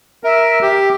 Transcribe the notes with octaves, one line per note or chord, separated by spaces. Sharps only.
A#4 E5
G4